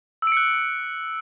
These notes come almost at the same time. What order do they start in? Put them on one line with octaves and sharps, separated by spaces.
E6 D7 C#7 F#6